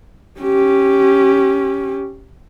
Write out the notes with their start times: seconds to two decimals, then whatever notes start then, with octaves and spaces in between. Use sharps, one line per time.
0.40 C#4 G4